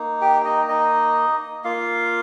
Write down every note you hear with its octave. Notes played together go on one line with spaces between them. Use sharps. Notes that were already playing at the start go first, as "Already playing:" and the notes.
Already playing: A#3 D#4
G4 G5
D#4 D#5
D#4 D#5
A#3 F4 F5